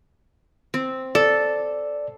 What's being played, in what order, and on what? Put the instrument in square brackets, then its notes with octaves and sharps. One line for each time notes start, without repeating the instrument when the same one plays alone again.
[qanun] C4
[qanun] A4 [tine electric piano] D5